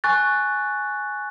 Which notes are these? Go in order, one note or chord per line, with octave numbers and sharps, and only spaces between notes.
G#5 C#6 F#6 A6